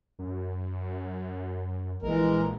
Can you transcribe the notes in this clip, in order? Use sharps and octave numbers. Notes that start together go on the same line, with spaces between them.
F#2
A#1 E3 G#3 A#4